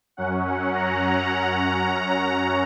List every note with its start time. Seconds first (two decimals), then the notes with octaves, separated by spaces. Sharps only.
0.17 F#2 F#3 C#4 F#5
0.45 F#5
0.74 A#5
1.30 A#5